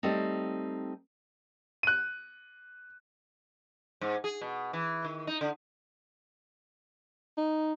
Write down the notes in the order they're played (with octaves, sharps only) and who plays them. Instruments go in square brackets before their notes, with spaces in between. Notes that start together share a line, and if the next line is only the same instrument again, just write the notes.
[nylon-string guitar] G3 A3 C4 D#4
[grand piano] F#6 D#7
[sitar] G#2
G#4
B2
E3
D#3
D#4
D3
[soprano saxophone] D#4